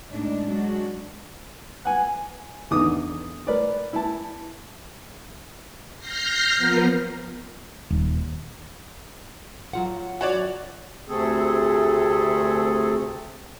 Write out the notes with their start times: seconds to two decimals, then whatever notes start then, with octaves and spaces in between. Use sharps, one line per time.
0.10 A2 G#3 D4 D#4
0.45 F#3 G#3 D4 F#4
1.85 F#5 G#5
2.71 E2 D3 D#3 D6 D#6
3.47 A#4 B4 D5
3.93 E4 A5
5.98 F6 G6 A#6 C7
6.56 F3 B3 A#4
7.90 D#1
9.73 F#3 F4 F#5
10.21 F#4 C#5 D5
11.08 D2 C3 A3 C4 G#4 A4